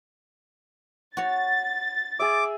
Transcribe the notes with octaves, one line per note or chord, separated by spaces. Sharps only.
F#4 C#5 A6
G#4 E5 D6